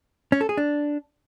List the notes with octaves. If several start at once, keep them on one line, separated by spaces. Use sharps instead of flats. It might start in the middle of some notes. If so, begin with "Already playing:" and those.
C#4
A4
G#4
D4